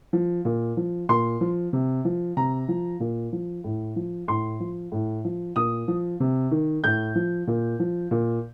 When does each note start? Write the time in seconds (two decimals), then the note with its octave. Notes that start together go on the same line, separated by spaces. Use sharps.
0.13 F3
0.45 A#2
0.77 F3
1.09 A#2 C6
1.41 F3
1.73 C3
2.05 F3
2.37 C3 A#5
2.68 F3
3.00 A#2
3.33 F3
3.64 A2
3.96 F3
4.28 A2 C6
4.60 F3
4.92 A2
5.25 F3
5.56 A#2 D#6
5.88 F3
6.20 C3
6.51 D#3
6.84 A2 G6
7.15 F3
7.47 A#2
7.80 F3
8.11 A#2